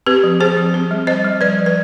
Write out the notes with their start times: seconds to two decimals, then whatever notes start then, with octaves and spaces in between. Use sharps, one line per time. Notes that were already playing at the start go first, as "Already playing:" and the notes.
0.06 C4 G4 B4
0.23 F3
0.40 C4 G#4 C5
0.57 F3
0.74 C4
0.91 G3
1.07 C4 C5 D#5
1.24 G3
1.41 F3 B4 D5
1.58 F3
1.66 B4